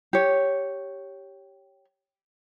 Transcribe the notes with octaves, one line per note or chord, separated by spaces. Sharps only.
G4 C#5